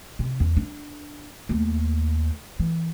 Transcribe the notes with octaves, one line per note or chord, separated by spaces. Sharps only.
C3
E2
D4
D#2 A3
E3